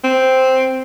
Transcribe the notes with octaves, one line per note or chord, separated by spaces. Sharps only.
C4